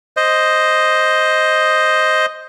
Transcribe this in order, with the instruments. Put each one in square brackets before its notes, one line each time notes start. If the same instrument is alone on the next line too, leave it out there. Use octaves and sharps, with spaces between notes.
[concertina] C5 D#5